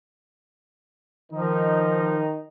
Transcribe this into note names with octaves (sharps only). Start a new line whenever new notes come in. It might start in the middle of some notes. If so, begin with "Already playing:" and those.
D#3 F3 D#4